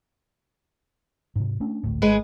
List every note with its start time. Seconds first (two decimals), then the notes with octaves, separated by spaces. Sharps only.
1.36 G#2 C3
1.60 A3 C#4 D4
1.84 G#1 D2 A2
2.02 G#1 G#3 G#4 B4